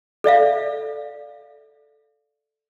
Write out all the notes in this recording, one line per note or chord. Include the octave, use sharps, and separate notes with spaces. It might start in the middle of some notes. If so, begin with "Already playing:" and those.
A4 D5 E5 F5